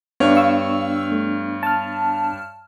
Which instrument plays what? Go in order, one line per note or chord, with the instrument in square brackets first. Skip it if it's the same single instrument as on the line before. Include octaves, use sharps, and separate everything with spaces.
[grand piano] G2 C#5 [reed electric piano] B3 D4
[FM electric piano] F5 C#6 E6
A3
A5 F6